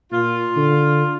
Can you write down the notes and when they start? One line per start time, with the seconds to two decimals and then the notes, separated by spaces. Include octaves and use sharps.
0.12 A#2 F4
0.56 D3